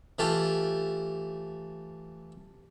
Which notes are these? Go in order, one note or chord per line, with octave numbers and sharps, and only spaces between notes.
E3 A3 F4 G4